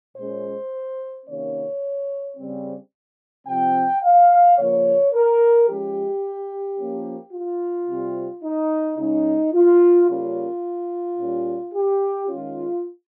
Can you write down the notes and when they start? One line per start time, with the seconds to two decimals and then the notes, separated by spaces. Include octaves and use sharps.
0.16 A#2 G#3 C#4 C5
1.26 C3 D#3 A#3 C#4 C#5
2.37 C#3 G3 C4
3.47 C3 F3 C4 G5
4.03 F5
4.57 C#3 F3 A#3 C#5
5.13 A#4
5.67 F3 G#3 C#4 G4
6.78 F3 A#3 C#4
7.33 F4
7.87 C3 G3 C4
8.43 D#4
8.98 C#3 G#3 C#4 D#4
9.53 F4
10.08 C#3 G3 A#3 C#4 F4
11.18 A#2 G3 C#4
11.73 G4
12.28 D#3 G#3 C#4 F4